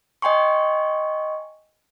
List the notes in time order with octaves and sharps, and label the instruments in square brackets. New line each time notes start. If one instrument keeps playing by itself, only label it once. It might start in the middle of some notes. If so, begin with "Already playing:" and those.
[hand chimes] D#5 G5 G#5 C6 C#6